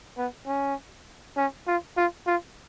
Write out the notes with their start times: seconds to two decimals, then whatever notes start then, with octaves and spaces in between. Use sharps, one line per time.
0.17 B3
0.47 C#4
1.37 C#4
1.67 F4
1.97 F4
2.27 F4